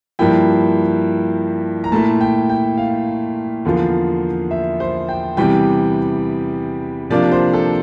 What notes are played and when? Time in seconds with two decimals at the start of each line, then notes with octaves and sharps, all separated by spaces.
0.19 G2 F3 A#3 E4 G5
1.84 A#5
1.92 A#2 A3 E4 A5
2.21 G5
2.49 G5
2.78 F5
3.65 E2 D3 F3 A#3 F4
4.51 E5
4.80 C5
5.09 G5
5.37 E2 C3 E3 G3 G5
7.10 C3 F3 A#3 D4 F4 D5
7.32 C5
7.53 A4